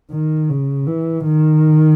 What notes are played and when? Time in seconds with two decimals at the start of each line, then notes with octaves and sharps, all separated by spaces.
0.11 D#3
0.49 C#3
0.87 E3
1.25 D#3